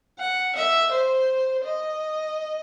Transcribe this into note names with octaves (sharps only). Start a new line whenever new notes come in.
F#5
E5
C5
D#5